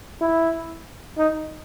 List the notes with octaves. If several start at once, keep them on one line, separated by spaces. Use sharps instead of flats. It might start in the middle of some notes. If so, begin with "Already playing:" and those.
E4
D#4